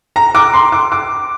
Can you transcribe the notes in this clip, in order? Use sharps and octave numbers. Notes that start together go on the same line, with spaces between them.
A#5
D6
C6
D6
D6